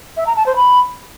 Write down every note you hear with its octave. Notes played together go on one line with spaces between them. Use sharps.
E5
A#5
A5
C5
B5